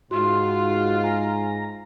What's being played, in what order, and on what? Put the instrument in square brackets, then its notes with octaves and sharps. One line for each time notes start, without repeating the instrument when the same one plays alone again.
[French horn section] G#2 [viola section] F4 [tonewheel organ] F#4 [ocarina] C6
[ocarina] G#5 [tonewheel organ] A#5